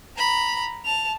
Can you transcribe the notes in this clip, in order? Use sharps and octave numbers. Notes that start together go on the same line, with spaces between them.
A#5 B5
A5 F7